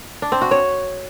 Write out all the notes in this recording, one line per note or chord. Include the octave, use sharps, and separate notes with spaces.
D4
C4
F#4
C#5